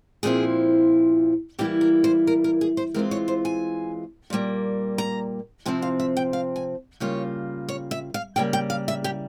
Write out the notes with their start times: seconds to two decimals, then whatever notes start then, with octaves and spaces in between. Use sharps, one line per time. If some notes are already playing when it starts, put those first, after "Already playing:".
0.23 A#2 F3 C4 E4 G#4
1.59 E3 G3 A#3 E4 G4
1.81 A#4
2.04 C5
2.27 A#4
2.44 A#4
2.61 G#4
2.77 C5
2.94 E3 G#3 C4 F4 A#4
3.11 C#5
3.28 C5
3.45 G#5
4.30 A#2 G3 A#3
4.98 A#5
5.66 C3 F3 C4 E4 G#5
5.82 F5
6.00 E5
6.17 G5
6.33 F5
6.56 G#5
7.00 C#3 G3 A#3 F4 C#5
7.69 C#5
7.91 E5
8.14 F5
8.36 C#3 G3 A#3 G5
8.53 G5
8.70 F5
8.88 E5
9.04 G4